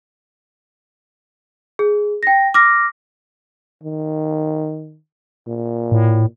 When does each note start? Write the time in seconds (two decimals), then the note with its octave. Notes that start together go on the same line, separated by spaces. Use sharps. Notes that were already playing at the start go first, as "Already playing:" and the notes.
1.79 G#4
2.23 G5 A#6
2.54 D6 F6 A#6
3.83 D#3
5.47 A#2
5.92 A2